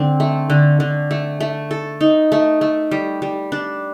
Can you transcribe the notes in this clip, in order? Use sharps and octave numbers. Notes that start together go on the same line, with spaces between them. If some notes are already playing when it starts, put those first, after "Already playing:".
Already playing: D3 C4
A3
D3
D3
A3
A3
A4
D#4
A3
A3
G3
G3
D4